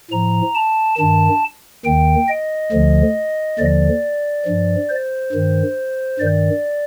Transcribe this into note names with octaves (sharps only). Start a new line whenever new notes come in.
A2 F3 A#5
A5
G2 D#3 A5
D#2 D#3 G5
D#5
D2 D3 F3
D#2 D3 F3 D5
G2 F3
C5
G2 D#3
G2 D#3 D5